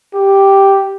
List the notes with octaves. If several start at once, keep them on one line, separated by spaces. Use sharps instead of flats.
G4